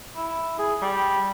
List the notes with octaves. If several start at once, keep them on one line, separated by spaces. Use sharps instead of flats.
E4
G#4
G3